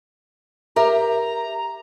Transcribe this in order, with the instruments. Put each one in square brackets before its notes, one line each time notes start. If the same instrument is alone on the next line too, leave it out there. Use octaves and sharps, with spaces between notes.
[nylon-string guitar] G4 A#4 E5 [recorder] A#5